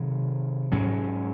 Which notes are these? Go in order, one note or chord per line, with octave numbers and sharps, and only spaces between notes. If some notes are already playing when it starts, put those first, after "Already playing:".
Already playing: C3 D#3 F#3
G#2 F#3 C#4